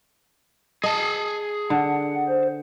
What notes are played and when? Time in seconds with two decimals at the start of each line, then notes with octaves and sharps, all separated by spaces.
0.83 G#4 D#5 A5
1.70 D3 F#5
2.28 C5